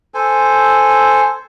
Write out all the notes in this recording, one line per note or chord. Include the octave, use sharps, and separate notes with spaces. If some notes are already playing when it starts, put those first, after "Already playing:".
A4 C5 G#5